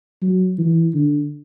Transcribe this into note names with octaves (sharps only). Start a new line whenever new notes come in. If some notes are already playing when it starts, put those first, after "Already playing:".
F#3
E3
D3